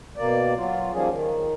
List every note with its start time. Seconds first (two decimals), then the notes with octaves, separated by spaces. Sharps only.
0.17 B2 A#3 D5
0.56 F#3 F4
0.93 D#3 F3 G3 A#3 C#4 G#4
1.10 D#3